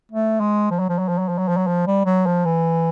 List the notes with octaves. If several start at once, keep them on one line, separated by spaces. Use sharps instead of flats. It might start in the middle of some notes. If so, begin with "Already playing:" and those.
A3
G#3
F3
F#3
F3
F#3
F3
F#3
F3
F#3
F3
F#3
F3
G3
F#3
F3
E3